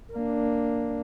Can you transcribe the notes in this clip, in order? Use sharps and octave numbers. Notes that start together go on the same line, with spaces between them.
A#3 D4